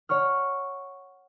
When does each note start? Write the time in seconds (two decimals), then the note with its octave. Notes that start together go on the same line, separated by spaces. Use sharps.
0.09 C#5 F#5 C#6 F6